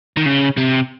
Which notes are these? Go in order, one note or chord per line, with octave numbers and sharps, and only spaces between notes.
D#3
C#3
C3